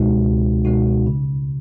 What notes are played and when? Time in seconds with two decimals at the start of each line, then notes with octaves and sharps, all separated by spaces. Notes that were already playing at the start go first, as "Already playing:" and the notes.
Already playing: C#2 B2 G#3 D#4 F#4
0.24 C#2
0.65 B2 G#3 D#4 F#4
1.07 C#3